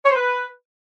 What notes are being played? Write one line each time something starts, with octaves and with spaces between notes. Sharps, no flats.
C#5
C5
B4